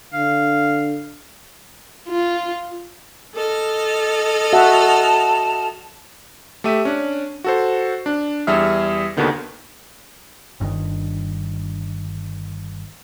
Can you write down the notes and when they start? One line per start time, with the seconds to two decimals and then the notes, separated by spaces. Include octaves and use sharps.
0.13 D3 F5
2.08 F4
3.34 A4 D#5 F6
4.53 F#4 E5 F#5 A5
6.64 A3 G4 E5 D#7
6.85 C#4 D4
7.44 F#4 A4 C5
8.06 D4
8.47 E2 G3 G#4 E5 F6
9.17 D#2 B2 D3 D#3 B3
10.60 G1 G2 C3 D#3